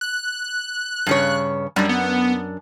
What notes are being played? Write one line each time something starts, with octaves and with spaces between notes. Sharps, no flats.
F#6
G2 C#3 C#5
F#2 G3 D4
B3